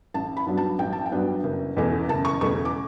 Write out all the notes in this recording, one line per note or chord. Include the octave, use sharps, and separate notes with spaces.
A1 A5
B5
G2 F#3 B3 D4
A5
A1 G5
A5
G5
G2 F#3 B3 D4
F#1
E2 B2 A3 C#4
F#1 A5
C#6
E2 B2 A3 C#4 C#6
D6